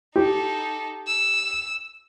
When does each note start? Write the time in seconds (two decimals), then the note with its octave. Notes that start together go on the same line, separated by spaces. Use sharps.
0.16 D#4 G4 A4
1.07 E6